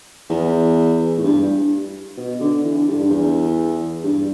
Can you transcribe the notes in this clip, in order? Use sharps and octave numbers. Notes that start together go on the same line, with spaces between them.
E2
A2
G2
B2
D3
E3
D3
G2
G2
E2
G2